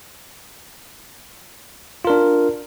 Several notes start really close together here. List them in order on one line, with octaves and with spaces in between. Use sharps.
F4 A#4 D4